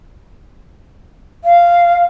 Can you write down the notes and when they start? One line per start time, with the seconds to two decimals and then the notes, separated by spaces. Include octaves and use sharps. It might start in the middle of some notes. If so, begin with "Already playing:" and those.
1.44 F5